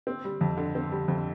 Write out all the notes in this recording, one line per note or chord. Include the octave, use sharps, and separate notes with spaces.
C4
G3
F2
D3
C4
G3
F2